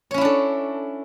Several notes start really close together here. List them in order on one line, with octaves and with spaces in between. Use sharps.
C#5 C#4 E4 D4 A4